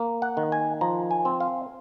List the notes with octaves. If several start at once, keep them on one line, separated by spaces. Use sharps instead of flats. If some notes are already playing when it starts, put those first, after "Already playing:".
Already playing: A#3
F#5
D#3
G#5
F3 A#5
G#5
C4
F5